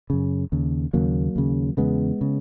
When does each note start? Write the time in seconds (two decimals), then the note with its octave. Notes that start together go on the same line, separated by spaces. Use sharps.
0.10 F#2 C#3
0.52 D#2 C#3
0.93 D#2 C#3 F#3 A#3
1.36 D#2 C#3
1.77 E2 C#3 G#3 B3
2.21 C#3